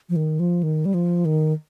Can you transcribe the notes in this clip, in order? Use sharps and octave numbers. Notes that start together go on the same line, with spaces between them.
F3
D#3
F3
D#3
G3
F3
D#3